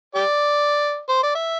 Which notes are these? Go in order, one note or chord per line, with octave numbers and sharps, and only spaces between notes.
G4 D5
C5
D5
E5